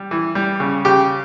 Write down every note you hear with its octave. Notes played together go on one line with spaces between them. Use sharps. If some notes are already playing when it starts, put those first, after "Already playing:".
Already playing: G3
E3
G3
C#3
C#3 G4